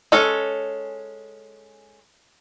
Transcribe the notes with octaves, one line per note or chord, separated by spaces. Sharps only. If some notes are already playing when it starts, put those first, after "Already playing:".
G#3 C#4 A4